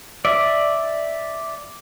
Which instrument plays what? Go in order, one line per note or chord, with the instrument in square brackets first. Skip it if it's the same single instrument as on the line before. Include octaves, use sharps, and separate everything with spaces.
[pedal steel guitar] D5 E5